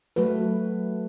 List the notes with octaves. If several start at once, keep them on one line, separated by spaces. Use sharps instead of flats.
F#3 A3 F#4 B4